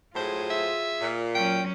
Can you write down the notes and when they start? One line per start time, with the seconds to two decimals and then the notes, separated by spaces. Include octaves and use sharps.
0.15 A2 F#3 F4 G#4 C5
0.50 E5
1.00 A#2
1.35 F#3 C#4 G5